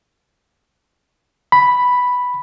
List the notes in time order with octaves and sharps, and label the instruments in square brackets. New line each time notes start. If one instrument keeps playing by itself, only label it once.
[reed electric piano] B5